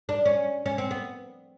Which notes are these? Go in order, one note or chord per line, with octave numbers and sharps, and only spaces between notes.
D4
C#4
C#4
C4
B3